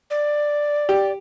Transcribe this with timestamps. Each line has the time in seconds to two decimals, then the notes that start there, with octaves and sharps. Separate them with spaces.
0.10 D5
0.89 G4